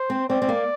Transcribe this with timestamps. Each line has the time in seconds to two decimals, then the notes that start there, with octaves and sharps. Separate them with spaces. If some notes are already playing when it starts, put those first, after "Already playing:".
Already playing: C5
0.10 C4
0.29 C4 D5
0.42 C4
0.49 A#3